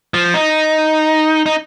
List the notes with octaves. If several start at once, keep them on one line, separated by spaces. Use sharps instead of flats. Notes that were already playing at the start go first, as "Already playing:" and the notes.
F3
D#4
D#4